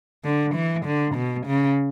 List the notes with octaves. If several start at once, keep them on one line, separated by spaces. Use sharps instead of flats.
D3
E3
D3
B2
C#3